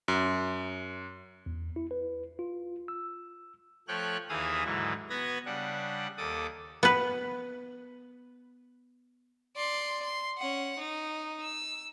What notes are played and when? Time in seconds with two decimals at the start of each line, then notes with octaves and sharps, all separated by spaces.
0.08 F#2
1.46 E2
1.76 E4
1.91 B4
2.39 F4
2.88 E6
3.88 F3 A3 C#5 G5 F6 F#6
4.29 D#2 E3 G#4 E5 F5 D#6
4.65 G#2 D3 E3 F#3 E4
5.10 B3 F#4 B4 G#6 A#6
5.45 C#3 G3 D4 F#5
6.17 D#2 A4 D6 D#6
6.83 B3 B4
9.56 D5 C6
10.03 C6
10.38 C#4 F#5
10.78 D#4
11.42 E6